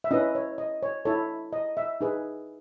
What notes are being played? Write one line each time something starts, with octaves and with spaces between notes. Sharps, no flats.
E5
C#4 E4 B4 D#5
C#5
D#5
C#5
E4 A4 C#5
D#5
E5
D#4 G#4 B4